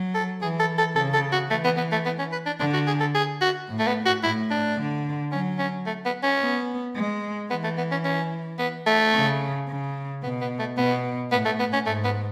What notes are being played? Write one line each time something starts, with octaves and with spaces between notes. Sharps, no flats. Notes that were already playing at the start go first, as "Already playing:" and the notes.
Already playing: F#3
A4
E3 G#4
A4
A4
C#3 A4
A4
F#4
E3 A3
B3
B3
A3
B3
C#4
B4
D4
D3 D4
F#4
G#4
A4
G#4
F#4
A2
A3
B3
F#4
A2 E4
D4
D3
F#3 C#4
C#4
A3
B3
C#4
B3
G#3
E3 B3
A3
B3
C#4
C#4
B3
A3
C#3
C#3
B2 B3
B3
A3
B2 B3
A2 B3
A3
B3
C#4
G#2 A3
B3